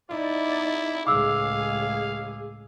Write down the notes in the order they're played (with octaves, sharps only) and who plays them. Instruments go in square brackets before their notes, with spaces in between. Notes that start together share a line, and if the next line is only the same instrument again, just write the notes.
[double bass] D#4 [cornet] E4 [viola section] D5
[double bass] C#2 A2 [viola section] G#4 [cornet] F5 [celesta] D6 E6